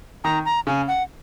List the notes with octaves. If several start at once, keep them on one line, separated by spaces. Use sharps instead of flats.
D#3 A#5
A#5
C#3 G#5
F#5